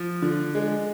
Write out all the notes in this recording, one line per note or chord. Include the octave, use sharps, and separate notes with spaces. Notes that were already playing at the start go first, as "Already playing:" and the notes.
Already playing: F3
D3
G#3